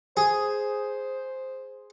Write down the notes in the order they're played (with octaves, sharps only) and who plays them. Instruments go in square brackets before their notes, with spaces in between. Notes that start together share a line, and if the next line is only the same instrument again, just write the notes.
[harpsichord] G#4 [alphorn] C5